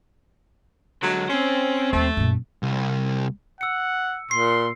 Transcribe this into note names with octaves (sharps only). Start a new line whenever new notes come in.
D3 F#3 G#3
C4 C#4 C5
D#2 F3 A3
F#2 A#2
C2
F#5 E6 C#7
A#2 C6 C7